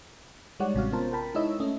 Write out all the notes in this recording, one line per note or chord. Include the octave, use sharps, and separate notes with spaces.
G3 G#3 D#4 C#5 D5 F#5
A1 C3 C#4 F#4 F5
B3 C#4 F4 A#4 C5 A5
A#4 G5 A5 B5
G#3 D#4 E4 C#5 D#5 E6
A3 C#4 A4 D#5 E5